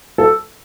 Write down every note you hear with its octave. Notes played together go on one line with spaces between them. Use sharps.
A4